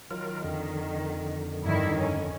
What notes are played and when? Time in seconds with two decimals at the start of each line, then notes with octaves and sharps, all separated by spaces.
0.11 D#3 F#3 F4 A#4
0.44 F2 D3
1.63 G2 D#3 E4
1.99 C#4